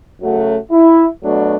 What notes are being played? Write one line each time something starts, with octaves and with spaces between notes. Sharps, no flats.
F#2 C#3 F#3 A3 F#4
E4
B2 F#3 A3 D4